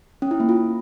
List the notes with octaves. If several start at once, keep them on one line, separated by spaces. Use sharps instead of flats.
C#4
E4
A#3
F4